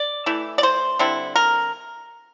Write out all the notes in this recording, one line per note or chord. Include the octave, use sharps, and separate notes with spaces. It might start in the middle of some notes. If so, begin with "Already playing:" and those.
Already playing: D5
E3 A3 E4
D5
C5
D3 G3 C4 E4
A#4